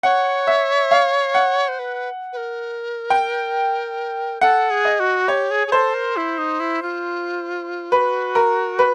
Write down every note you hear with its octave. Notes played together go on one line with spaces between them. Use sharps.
C#5 F#5
E5
F5
F#5
C5
B4
B4
A#4
G5
A4 F#5
G#4
D#5
F#4
G4 C#5
G#4
G#4
A4 C5
A#4
E4
D#4
E4
F4
F#4 B4
A#4
B4